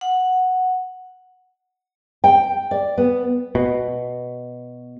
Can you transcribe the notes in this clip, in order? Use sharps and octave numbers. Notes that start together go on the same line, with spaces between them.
F#5
G5
D5
B3
B2